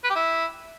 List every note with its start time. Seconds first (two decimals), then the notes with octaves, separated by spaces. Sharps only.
0.04 B4
0.10 G4
0.15 E4